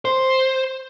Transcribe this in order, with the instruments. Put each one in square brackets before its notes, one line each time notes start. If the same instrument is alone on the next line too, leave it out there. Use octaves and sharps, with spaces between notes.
[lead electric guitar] C5